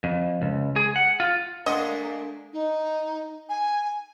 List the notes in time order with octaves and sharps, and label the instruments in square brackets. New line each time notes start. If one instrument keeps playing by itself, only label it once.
[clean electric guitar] F2
C#2
G#4
F#5
F4
[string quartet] A3 A#3 [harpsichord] D4 [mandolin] G#4 F#5 C6 [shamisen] D#5
[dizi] D#4
G#5